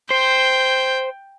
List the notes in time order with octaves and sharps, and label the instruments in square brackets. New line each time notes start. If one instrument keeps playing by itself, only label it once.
[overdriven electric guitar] C5 [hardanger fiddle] G5